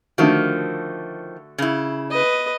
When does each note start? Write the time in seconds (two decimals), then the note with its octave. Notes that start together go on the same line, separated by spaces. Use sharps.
0.18 D3 D#3 F3 A3 F#4
1.58 C#3 E4
2.11 B4 D#5